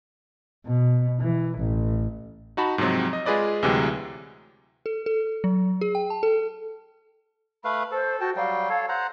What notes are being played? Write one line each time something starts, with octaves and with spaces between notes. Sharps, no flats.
B2
E3
A1
D#4 F#4 A5 B5
G#2 C3 F3 F#3 C4
D#5
G#3 F4 G#4 B4 D5 D#5
D2 C3 E3 F#3 G#3 G4
A4
A4
F#3
G#4
G5
A5
A4
A3 B4 F5 B5
A4 C5
F#4 G5 A5
F#3 G3 F5 G5
A4 C#5
C5 F#5 A#5